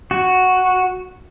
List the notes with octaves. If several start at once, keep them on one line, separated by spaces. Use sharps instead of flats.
F#4